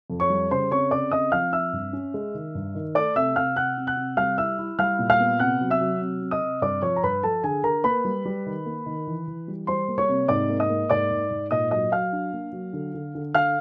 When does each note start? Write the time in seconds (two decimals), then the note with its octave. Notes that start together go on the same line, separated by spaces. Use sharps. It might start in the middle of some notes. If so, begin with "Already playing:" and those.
0.10 F2
0.20 C#5 C#6
0.30 G3
0.51 C#3 C5 C6
0.71 C4 C#5 C#6
0.91 C#3 D5 D6
1.12 C4 D#5 D#6
1.32 F3 F5 F6
1.52 C4 E5 E6
1.73 G2
1.93 C#4
2.14 G#3
2.34 D#3
2.55 G2
2.75 D#3
2.95 A3 D5 D6
3.16 C3 E5 E6
3.36 C3 F5 F6
3.56 C3 F#5 F#6
3.78 C3
3.87 F#5 F#6
3.97 C3
4.17 G3 F5 F6
4.38 E4 E5 E6
4.59 E4
4.79 G3 F5 F6
4.99 A#2
5.10 F5 F6
5.20 B3
5.39 C3 F#5 F#6
5.61 F#3
5.70 E5 E6
5.81 F#3
6.01 C3
6.22 C3
6.31 D#5 D#6
6.42 C3
6.62 G2 D5 D6
6.82 F3 C#5 C#6
6.96 A#5
7.03 G2 B4 B5
7.23 F3 A4 A5
7.43 D3 G#4 G#5
7.64 D3 A#4 A#5
7.84 A#3 B4 B5
8.05 G3
8.25 G3
8.46 D#3
8.66 A#3
8.86 D#3
9.07 E3
9.27 E3
9.48 G3
9.67 G3 C5 C6
9.88 A#3
9.98 C#5 C#6
10.09 C3
10.28 G#2 D5 D6
10.49 A#3
10.60 D#5 D#6
10.70 A#3
10.90 G#2 D5 D6
11.11 G#2
11.30 G#2
11.51 A#2 D#5 D#6
11.71 F#3 D#5 D#6
11.92 F#3 F5 F6
12.13 D4
12.33 A#3
12.53 F#3
12.73 D3
12.94 D3
13.15 D3
13.34 D3 F5 F6